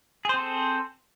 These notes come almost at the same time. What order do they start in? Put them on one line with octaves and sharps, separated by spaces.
G#4 C5 C4 A4